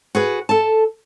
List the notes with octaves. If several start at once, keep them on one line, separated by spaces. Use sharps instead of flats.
F#4 G#4 B4
A4 A5